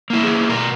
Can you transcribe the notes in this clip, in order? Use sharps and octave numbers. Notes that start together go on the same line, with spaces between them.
A#3 E4
G#4
B2 A#4